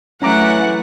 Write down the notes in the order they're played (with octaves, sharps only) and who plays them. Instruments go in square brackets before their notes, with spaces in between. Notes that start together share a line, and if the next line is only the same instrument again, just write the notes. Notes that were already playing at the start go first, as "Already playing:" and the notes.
[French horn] E3 [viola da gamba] F#3 A3 [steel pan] C#4 A#5 D6 [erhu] F#5